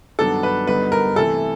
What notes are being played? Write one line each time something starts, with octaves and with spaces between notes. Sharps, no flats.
G2 D#3 F#3 B3 D4 A4
B4
G2 D3 G3 B3 D#4 B4
A#4
C3 E3 A3 A4